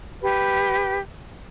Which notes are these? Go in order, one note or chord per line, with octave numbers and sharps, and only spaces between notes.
G4 B4